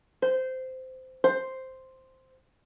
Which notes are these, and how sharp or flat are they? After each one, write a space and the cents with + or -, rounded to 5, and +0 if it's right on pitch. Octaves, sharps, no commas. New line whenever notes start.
C5 -15
C5 +0